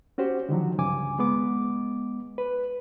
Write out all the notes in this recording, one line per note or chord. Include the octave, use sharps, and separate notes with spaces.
C#4 F#4 G4 C5
D3 D#3 F3 F#3
C#2 G2 C#3 G#5 D6
G#3 B3 D6
B4